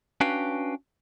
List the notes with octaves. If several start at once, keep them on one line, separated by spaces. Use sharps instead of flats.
C#4 D4 F#4 B4 F5 G5